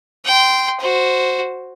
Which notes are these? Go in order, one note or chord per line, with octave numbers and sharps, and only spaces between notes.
G5 C6
F#4 C5